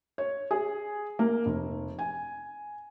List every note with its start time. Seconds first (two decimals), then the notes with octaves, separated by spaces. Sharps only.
0.18 C#5
0.51 G#4
1.19 A#3
1.46 F1
1.99 G#5